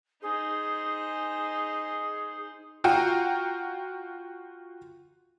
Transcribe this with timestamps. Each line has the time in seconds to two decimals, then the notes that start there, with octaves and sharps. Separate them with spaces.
0.22 D#4 G#4 C5
2.84 F4 F#4 G5 A#5